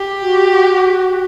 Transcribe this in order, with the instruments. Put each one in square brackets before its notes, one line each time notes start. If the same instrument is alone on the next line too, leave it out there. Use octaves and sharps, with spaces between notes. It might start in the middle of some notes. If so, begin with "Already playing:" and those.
Already playing: [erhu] G4
[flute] F#4